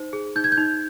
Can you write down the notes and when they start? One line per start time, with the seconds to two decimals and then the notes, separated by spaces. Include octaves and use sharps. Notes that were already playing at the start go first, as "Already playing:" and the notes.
Already playing: D#4 C5
0.13 G#4
0.36 D#4 G6
0.44 G#6
0.52 G6
0.58 D#4